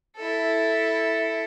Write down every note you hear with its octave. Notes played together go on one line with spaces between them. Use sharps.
E4 A4